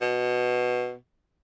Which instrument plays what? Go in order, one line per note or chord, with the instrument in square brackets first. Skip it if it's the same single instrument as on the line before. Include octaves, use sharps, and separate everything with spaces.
[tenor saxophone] B2